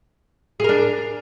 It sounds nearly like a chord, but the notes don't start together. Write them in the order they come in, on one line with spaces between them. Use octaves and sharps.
G#4 A#4 D4